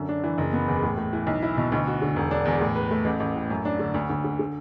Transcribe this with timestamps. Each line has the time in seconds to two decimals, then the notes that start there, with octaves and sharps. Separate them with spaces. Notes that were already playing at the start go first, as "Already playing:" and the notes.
Already playing: F#2 D3
0.09 D4
0.24 E3
0.38 F#1
0.53 B3
0.68 E2
0.83 A2
0.97 A2
1.13 E3
1.27 B1
1.43 E4
1.57 B2
1.72 D2
1.87 F#4
2.02 D3
2.16 E1
2.31 D4
2.45 E2
2.61 A2
2.75 B4
2.91 A3
3.05 A1
3.20 A1
3.36 A2
3.50 F#2
3.65 D4
3.79 D3
3.94 D2
4.10 D2
4.24 D3
4.39 D3